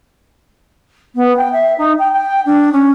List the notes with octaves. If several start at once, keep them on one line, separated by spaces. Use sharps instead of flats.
B3
G5
E5
D#4
G5
G5
D4
C#4